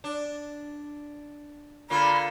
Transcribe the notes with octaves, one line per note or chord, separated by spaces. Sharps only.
D4
D3 A#3 F4 B5